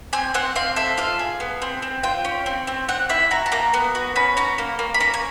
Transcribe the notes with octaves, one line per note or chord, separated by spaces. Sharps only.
C4 G#5
C4 F#5
C4 F5
A4 E5
F4 F5
G#4
B3
C4
C4
F4 G5
C#4
C4
C4
C4 F#5
E4 E5
F#4 A#5
A5
A#3 A#5
B3
F#4
C#4 B5
C#4 A#5
A#3
A#3
B5
C#4 A#5
G#5